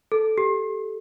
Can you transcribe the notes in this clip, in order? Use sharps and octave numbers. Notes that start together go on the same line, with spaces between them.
A4
G4